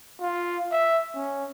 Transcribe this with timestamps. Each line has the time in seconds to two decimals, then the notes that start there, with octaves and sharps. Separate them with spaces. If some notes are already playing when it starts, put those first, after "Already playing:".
0.20 F4
0.72 E5
1.16 C#4